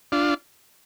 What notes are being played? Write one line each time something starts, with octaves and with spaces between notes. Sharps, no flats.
D4 F4